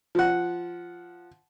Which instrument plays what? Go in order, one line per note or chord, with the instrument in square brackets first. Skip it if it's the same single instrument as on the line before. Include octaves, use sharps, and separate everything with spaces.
[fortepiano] F3 F#5